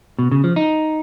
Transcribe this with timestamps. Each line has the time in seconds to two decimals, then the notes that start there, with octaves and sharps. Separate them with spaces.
0.19 B2
0.32 C#3
0.44 F3
0.56 D#4